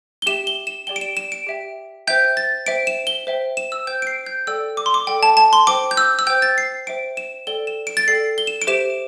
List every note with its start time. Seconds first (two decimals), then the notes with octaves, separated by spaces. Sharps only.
0.22 G7
0.26 G4 E5 G5 E7
0.47 G7
0.67 E7
0.87 G4 D5 G5 G7
0.96 D7
1.01 E7
1.17 E7
1.32 D7
1.47 G4 E5 G5
2.07 C5 E5 G5 G6
2.37 A6
2.66 C5 E5 G5 D7
2.87 E7
3.07 G7
3.27 C5 E5 G5
3.57 E7
3.72 E6
3.87 C5 G5 G6
4.02 D7
4.07 C7
4.26 G6
4.47 A4 D5 G5 E6
4.77 D6
4.86 C6
4.94 D6
5.07 A4 D5 G5
5.23 A5
5.37 A5
5.53 C6
5.67 C5 G5 D6
5.91 G6
5.97 E6
6.19 E6
6.27 C5 G5 G6
6.42 A6
6.58 C7
6.87 C5 E5 G5 D7
7.17 E7
7.47 A4 D5 G5 G7
7.67 E7
7.87 D7
7.97 A6
8.08 A4 D5 G5 C7
8.38 G7
8.47 E7
8.62 D7
8.67 G4 C5 E5 E7